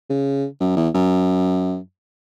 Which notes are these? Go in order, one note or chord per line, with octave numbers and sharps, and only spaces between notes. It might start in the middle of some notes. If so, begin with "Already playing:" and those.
C#3
F#2
E2
F#2